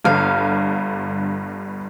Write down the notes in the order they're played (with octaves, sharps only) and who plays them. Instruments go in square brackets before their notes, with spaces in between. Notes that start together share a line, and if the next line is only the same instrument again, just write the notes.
[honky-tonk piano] G1 G2 D3 [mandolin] F5